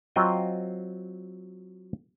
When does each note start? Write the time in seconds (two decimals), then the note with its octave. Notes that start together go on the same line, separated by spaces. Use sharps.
0.16 F#3 C4 F4 D#5 G5